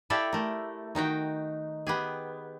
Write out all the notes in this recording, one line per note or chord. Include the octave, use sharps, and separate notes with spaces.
E4 G4 A4 D5 E5 F5
A3 A#4
D#3 D#4 F#4 G5
B3 G4 G#4